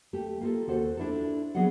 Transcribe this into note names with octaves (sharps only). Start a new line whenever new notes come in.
A3 G4
A#3 F4 A4
D#2 F#4 A4 C5
D4 E4 F4 A4
F#3 B3 G#4 C#5 D#5 F#5